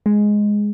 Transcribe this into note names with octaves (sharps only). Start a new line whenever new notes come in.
G#3